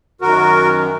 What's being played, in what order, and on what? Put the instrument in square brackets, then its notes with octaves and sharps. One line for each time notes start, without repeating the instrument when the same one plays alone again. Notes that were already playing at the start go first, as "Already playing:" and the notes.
[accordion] F#2 D#3 F#4 A#4